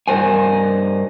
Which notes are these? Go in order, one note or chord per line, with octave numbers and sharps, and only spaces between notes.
G2 A#4 C5 G#5